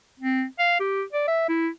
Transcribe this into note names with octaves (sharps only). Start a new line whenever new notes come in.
C4
F5
G4
D5
E5
E4